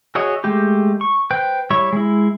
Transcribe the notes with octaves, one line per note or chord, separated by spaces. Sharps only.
F#4 G#4 C#5 D#5 E5
G#3 A3 G4
C#6
B4 C5 G5
G3 E4 C#5 C#6
G#3 E4